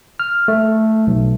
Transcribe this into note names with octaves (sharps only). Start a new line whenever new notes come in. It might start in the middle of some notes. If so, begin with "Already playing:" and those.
F6
A3
B1